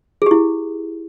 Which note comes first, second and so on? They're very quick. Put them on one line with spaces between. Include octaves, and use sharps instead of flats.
G#4 G4 E4